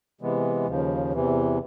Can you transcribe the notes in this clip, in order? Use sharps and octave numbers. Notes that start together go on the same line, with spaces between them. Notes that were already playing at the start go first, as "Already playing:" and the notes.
C3 E3 G#3 B3
D#2 C#3 F3
E2 C3 E3